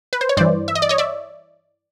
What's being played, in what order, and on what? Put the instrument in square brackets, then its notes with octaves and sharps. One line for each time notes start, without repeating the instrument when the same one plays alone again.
[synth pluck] B4
C5
C#5
G2 E3 C5 D5
E5
D#5
D5
C#5 D#5
D5 E5